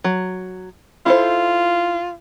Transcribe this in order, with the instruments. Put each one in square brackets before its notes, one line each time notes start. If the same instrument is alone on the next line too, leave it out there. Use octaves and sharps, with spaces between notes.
[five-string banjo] F#3
[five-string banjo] E4 A4 C5 [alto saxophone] F4